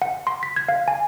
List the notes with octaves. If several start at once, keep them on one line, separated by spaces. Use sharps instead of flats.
F#5
C6
B6
G#6
F5
G#5